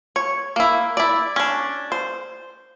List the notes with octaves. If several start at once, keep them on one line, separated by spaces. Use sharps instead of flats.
C#5
A#3 E4
E4 D5
C#4 D4
C5